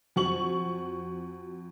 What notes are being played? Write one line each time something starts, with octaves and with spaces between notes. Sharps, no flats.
F2 F#4 C#6 F#7